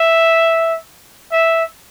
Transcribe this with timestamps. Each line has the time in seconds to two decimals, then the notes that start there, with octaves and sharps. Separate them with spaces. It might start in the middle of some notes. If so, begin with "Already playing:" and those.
Already playing: E5
1.32 E5